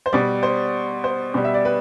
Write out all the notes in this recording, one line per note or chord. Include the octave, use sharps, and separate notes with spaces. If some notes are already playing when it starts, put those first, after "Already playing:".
C5
B2 G3 D5
C5
C5
B2 G3
E5
D5
B4